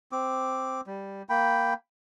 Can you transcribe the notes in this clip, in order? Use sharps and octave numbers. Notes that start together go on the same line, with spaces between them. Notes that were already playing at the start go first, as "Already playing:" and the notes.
C4 D6
G3
A#3 G5 B5